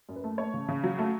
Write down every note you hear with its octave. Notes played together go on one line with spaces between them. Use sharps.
F#2
B4
A3
A3 C#5
C#3
C#3
F#3
A3